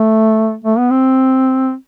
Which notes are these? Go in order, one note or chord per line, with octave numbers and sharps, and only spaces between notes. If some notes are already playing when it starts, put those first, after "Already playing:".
Already playing: A3
A3
B3
C4